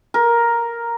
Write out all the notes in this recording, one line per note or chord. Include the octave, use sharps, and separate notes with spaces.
A#4